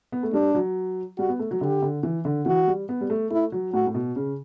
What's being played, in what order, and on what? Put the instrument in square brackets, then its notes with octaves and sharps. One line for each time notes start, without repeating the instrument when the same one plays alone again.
[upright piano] B3
A3
[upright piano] G3 [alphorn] D4
[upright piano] F#3
[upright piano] G3 [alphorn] F#4
[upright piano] B3
A3
F#3
[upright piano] D3 [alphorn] G4
[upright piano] D3
E3
D3
[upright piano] E3 [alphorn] F#4
[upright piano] G3
B3
G3
A3
[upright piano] A3 [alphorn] E4
[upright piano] F#3
[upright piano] A2 [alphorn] F#4
[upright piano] A2
B2
C#3